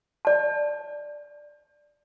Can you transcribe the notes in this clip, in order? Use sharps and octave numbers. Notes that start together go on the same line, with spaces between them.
D5 A5